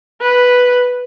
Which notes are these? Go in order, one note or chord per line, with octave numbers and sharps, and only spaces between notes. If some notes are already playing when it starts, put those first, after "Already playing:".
B4